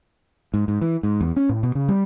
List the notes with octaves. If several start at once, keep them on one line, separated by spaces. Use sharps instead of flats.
G#2
G#2
E3
G#2
E2
C#4
A2
B2
C#3
G3